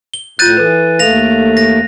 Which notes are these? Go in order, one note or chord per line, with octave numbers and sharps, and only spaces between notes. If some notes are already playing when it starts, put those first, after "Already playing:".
G7
A2 F4 F#6 G6 A6 D#7
E3 A4 B4
D#2 A3 A4 F5 A#6 F7
A#6